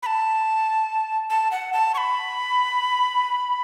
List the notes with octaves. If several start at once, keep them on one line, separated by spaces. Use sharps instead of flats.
B5
A5
A5
F#5
A5
C#6
B5